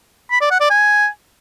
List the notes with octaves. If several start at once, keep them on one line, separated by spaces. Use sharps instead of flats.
B5
D5
F#5
D5
G#5